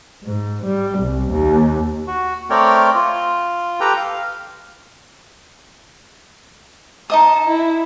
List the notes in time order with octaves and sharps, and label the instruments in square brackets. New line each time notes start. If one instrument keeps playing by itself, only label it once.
[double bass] G#2
G3
C2
D#2
[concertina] F#4
A3 C4 A#4 C#5 D5 G5
F4
G4 A4 B4 G5 A#5
F5
[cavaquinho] D#4 D#5 D#6 [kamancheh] A5
[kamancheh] E4